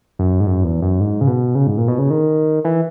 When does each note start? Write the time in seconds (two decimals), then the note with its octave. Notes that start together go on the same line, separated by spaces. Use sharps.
0.19 F#2
0.40 G#2
0.46 F#2
0.64 E2
0.82 F#2
1.00 G#2
1.21 C#3
1.28 B2
1.55 C#3
1.67 G#2
1.78 A#2
1.88 B2
1.98 C#3
2.10 D#3
2.65 E3